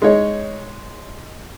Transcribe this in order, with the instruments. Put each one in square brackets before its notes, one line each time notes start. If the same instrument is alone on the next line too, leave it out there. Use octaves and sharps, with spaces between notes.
[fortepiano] G#3 D#4 C#5